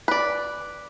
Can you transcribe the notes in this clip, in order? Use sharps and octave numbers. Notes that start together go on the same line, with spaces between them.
B4 D5